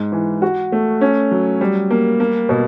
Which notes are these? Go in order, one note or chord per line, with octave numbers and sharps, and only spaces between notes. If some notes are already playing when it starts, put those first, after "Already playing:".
Already playing: G#2
E3
F#4
A3
C#4
F#3
G3
A#3
A#3
B2